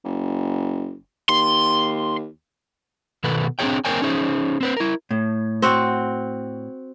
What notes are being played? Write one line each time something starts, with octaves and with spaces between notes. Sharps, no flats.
F#1
D#2 C6
B2 D#3 A4 B4
C4 D4 G4 G#4 C#5 G5
A#3 C4 A#4 C#5 G5 G#5
C#4 D#4 G#4 C5
C4 B4 C5
E4 A#4
A2
C4 F#4